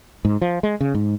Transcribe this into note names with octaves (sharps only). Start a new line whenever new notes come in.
G#2
F3
G#3
C#3
G#2